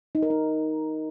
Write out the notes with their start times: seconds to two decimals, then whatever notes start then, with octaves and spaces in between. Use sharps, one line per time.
0.15 D#4
0.23 A#4
0.30 D#4